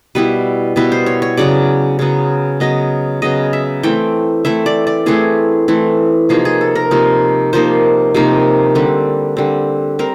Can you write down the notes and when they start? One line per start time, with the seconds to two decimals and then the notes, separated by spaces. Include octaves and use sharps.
0.15 B2 G3 B3 E4 B4
0.76 B2 G3 B3 E4 B4
0.92 C5
1.06 C#5
1.22 C#5
1.37 C#3 F#3 B3 D5
1.99 C#3 F#3 B3
2.60 C#3 F#3 B3 D#5
3.22 C#3 F#3 B3 D#5
3.53 E5
3.83 E3 A3 C4 E4 G5
4.45 E3 A3 C4 E4 E5
4.66 D5
4.87 D5
5.06 E3 A3 C4 E4 G#4
5.68 E3 A3 C4 E4
6.29 C3 F3 A#3 D#4 G#4
6.45 G#4
6.61 A4
6.75 A#4
6.91 C3 F3 A#3 D#4
7.53 C3 F3 A#3 D#4 C5
8.14 C3 F3 A#3 D#4
8.75 D3 G3 C4
9.37 D3 G3 C4
9.99 G3 C4 A#4